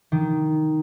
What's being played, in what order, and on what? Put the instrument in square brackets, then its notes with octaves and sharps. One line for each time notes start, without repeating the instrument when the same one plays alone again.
[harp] D#3